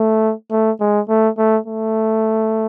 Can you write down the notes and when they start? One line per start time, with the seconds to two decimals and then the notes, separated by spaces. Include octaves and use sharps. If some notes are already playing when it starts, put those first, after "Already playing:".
Already playing: A3
0.51 A3
0.80 G#3
1.09 A3
1.38 A3
1.66 A3